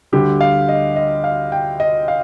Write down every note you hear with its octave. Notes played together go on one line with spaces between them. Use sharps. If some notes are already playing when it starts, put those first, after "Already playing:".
D2 D3 G3 G4
F5
D#5
D#5
F5
G5
D#5
F5